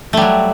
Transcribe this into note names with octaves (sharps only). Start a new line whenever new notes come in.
F#3 G3 A3